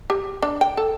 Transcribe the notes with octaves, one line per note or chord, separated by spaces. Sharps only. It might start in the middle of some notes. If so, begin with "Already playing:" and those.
G4
D4
G5
A4